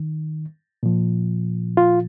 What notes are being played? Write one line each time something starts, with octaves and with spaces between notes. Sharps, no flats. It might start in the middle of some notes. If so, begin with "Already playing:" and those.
Already playing: D#3
A#2 F3
F4